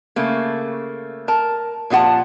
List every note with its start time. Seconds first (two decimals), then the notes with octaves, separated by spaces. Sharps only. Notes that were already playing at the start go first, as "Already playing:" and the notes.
0.16 C#3 A3 A#3
1.28 A#4 A5
1.90 A#2 F3 F4 F#5 A5